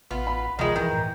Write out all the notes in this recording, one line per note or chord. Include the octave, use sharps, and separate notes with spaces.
A1 B3 F4
B5
D2 D#3 F3 G#3 D#5
G2 D#3 E3 G5
A2